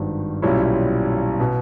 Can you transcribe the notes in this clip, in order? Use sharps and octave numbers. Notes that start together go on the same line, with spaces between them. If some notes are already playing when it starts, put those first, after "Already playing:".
Already playing: G#1 G2 D#3
B1 A#2 G3 C#4 E4
B2